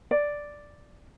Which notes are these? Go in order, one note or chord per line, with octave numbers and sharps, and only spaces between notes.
D5